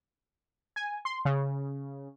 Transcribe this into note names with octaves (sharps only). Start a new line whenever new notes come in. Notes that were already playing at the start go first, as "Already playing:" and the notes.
G#5
C6
C#3